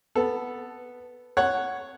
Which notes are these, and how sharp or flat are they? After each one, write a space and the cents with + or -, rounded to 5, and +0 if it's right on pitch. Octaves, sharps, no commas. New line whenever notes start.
B3 +0 A4 +0
C#5 +0 F#5 +0